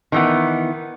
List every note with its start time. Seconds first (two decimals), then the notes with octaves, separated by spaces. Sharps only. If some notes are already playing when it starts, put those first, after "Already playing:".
0.12 D#3 E3 B3